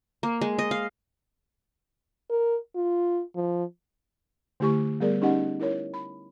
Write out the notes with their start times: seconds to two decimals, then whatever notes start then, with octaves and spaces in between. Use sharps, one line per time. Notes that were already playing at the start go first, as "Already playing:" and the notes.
0.23 A#3
0.41 G#3
0.59 D#5
0.71 F5
2.30 A#4
2.75 F4
3.36 F3
4.60 D3 A3 E4 G4 G#5 C#6
5.00 G3 B3 G#4 A#4 D5
5.22 C#4 D#4 G4 D#5 F#5 G#5
5.60 E4 A#4 C#5
5.94 B5